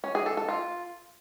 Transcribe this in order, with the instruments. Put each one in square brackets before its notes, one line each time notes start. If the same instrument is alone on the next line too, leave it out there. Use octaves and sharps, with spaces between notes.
[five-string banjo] C#4
G#4
A4
A4
F4